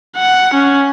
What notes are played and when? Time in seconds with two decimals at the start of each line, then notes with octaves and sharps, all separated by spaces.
0.17 F#5
0.54 C#4